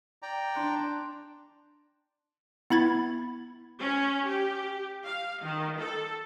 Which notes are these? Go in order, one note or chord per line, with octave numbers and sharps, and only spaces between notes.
D5 G5 A#5
D4 C6 F#6
B3 E4 B5 G#6 A6
C#4
G4
F5
D#3
A4